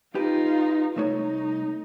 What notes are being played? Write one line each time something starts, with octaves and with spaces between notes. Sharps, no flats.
D#4 F4 G4 B4
C2 A3 D#4 C#5